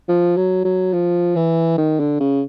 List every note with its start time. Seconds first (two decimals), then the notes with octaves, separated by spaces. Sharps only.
0.09 F3
0.37 F#3
0.65 F#3
0.93 F3
1.36 E3
1.78 D#3
1.99 D3
2.20 C#3